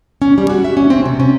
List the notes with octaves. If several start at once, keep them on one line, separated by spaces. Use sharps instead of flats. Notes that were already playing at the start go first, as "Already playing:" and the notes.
C#4
G3
F#4
E5
C#4
C4
C3
C#4